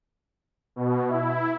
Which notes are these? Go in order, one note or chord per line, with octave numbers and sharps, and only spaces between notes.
B2
E4